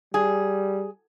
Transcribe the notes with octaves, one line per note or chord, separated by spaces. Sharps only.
G3 G#4